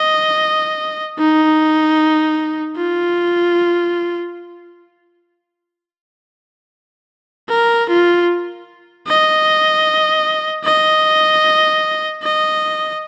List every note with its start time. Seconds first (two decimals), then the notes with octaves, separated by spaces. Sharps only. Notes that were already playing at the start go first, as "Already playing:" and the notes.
Already playing: D#5
1.19 D#4
2.77 F4
7.49 A#4
7.89 F4
9.08 D#5
10.64 D#5
12.23 D#5